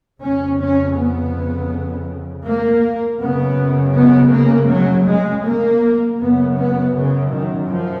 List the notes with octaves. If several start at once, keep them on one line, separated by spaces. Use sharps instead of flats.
F2 C#3 C#4
C#4
B3
A#3
F#2 C#3 B3
B3
A#3
F#3
G#3
A#3
F#2 C#3 B3
B3
C#3
D#3
F3